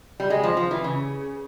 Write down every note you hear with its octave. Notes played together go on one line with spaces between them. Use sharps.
G3
G#3
F3
F3
E3
C#3